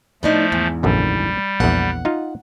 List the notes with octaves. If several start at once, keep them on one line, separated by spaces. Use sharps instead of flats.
A2 F3 A3 D4 D#4
E2 G#2
A#1 F#2 D3 G3
A#1 E2 F#5
D#4 F4 F5